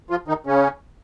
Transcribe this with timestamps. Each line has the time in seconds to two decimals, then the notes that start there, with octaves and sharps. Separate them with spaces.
0.10 F3 F4
0.28 D#3 D#4
0.47 C#3 C#4